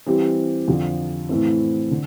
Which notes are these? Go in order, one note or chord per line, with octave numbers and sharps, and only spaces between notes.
E3 G3 C4 G4
F2 D3 F3
A2 E3 A3 C4
D3